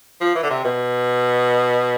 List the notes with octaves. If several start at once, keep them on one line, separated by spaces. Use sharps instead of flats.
F3
E3
D3
C3
B2